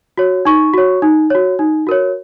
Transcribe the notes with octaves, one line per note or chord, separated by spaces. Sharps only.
F#4 C#5
D#4 C#6
F#4 C#5
D#4
F#4 C#5
D#4
F#4 A#4 C#5